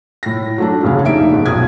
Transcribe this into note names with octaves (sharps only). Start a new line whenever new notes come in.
A2 A#6
F#3 A3 D4
A1 A2 C#3 C#4 G#4 F5
F1 A#3 D#4 E5 D7
G#2 B2 G#3
B1 A#2 D#6 G#6